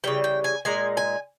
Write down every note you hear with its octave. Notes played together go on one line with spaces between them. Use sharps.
C#3 E3 G3 G5
G5
G#5
A#2 G#3 D#4 G#5
G#5